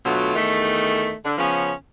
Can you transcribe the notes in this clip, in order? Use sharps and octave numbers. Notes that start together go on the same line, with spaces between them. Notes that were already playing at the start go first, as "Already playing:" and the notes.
D2 B2 F#3 A3 F4
E2 D#3 A3
D3
C#3 F3 B3 C#4